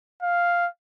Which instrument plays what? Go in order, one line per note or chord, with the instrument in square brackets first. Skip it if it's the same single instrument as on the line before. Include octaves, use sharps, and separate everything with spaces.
[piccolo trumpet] F5